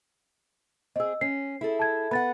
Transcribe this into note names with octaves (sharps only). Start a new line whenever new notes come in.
C4 G#4 D#5 E6
C#4 C7
E4 G#4 A4
A5 G#6
B3 F#5 B5 A6